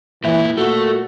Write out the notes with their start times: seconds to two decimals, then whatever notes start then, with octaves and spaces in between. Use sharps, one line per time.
0.24 A#2 E3 E4
0.57 A#2 A3 F#4